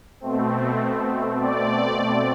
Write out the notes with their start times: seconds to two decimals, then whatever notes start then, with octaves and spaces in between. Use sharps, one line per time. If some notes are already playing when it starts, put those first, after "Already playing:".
0.20 B2 A3 C4
1.38 D5